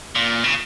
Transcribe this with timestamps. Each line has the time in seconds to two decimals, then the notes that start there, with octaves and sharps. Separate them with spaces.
0.15 A#2
0.44 C#3